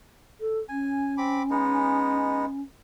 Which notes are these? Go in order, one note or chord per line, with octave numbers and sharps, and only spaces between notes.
A4
C#4 G#5
C4 B5 D6
G#3 B3 D#4